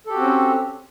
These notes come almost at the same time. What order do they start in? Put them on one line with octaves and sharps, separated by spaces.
A4 G4 F#4 C4 C#4